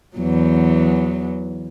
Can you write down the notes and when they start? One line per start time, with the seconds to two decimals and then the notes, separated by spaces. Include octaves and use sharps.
0.17 E2 E3 F#3